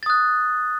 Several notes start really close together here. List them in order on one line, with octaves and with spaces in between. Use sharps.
A6 D#6 F#6